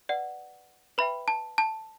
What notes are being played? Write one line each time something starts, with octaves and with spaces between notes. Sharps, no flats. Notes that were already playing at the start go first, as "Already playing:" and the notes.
B4 D5 F#5
B4 E5 G5 B5
A5
A5